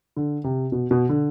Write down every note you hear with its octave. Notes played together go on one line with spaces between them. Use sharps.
D3
C3
B2
B2
D3